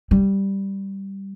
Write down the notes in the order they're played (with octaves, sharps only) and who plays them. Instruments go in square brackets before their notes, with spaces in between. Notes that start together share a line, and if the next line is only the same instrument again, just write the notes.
[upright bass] G3